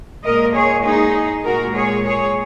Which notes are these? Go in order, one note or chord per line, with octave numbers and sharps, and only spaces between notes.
A#2 G#3 A#4 D#5
G#4 C#5
D#4 G#4
A#2 G#3 F#4 A#4
G#4 C#5
G#4 C#5